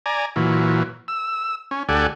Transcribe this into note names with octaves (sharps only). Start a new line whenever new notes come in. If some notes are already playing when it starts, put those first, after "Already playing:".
D5 G#5 A#5
A#2 E3 F#3
E6
C#4
D2 G4 A4 D5 F#5 G#5